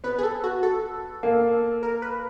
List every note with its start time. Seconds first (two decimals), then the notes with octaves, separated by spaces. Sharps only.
0.04 B3 B4
0.19 G#4
0.23 A4
0.44 F#4
0.63 A4
1.23 A#3
1.83 A#4
2.02 B4